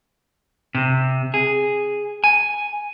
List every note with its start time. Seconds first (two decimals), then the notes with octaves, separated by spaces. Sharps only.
0.75 C3
1.34 G#4
2.24 G#5